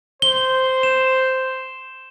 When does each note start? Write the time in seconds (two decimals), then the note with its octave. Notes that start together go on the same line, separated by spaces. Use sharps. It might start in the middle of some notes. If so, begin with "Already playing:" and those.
0.22 C5 G7
0.83 E7